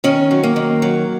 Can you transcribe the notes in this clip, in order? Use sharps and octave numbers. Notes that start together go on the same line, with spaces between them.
D#3 C#4
F#3
A#3
D#3
F#3